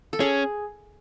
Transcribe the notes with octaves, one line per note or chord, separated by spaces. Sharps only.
A4
C#4 G#4